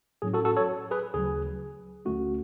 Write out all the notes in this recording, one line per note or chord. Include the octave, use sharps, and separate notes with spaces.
A2 F#3 C#4 G#4
F#4 A4
F#4 A4
A4 C#5
G#4 B4
D2 C#3 F#3 G#4
D2 D3 F#3 A3 C#4 F#4